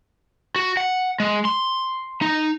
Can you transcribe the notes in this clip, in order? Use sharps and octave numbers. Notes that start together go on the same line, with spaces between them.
F#4
F#5
G#3
C6
D#4